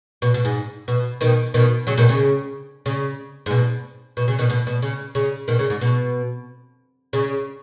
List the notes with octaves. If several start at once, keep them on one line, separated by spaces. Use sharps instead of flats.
B2
B2
G#2
B2
B2 D#3
B2 D#3
C#3 F#3
B2 D#3
C#3
C#3
G#2
B2
B2
C#3
B2 D#3
B2
B2
C#3
C#3
B2 D#3
C#3
G#2
B2
C#3